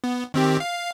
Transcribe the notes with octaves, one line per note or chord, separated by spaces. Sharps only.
B3
D#3 C4 G4
F5